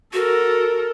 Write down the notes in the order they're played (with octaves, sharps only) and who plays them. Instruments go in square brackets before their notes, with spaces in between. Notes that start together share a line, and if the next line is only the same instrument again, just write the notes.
[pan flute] F#4 [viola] A4 A#4